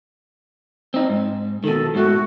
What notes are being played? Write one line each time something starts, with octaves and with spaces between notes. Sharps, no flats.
C4 D#4
G#2
B2 D#3 A4
G#2 A3 F#4